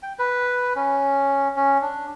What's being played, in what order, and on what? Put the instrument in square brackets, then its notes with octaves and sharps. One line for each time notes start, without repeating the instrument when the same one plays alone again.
[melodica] G5
B4
C#4
C#4
D4